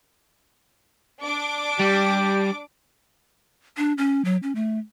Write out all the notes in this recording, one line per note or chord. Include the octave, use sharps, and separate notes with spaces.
D4 D6
G3 G4
D4
C#4
F#3
C#4
A3